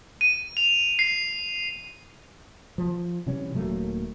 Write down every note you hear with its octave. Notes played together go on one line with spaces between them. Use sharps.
D#7
F7
C7
F3
C3 E3 G3 C#4
D#1 F#3 A3 A#3